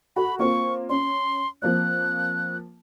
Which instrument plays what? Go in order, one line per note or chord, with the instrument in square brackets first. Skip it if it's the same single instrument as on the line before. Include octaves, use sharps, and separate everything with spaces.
[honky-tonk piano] F#4 A4 [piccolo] B5
[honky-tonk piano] A#3 C4 F4 [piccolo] C#6
[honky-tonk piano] C#4 [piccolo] C6
[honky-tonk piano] F3 A#3 C4 [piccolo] F#6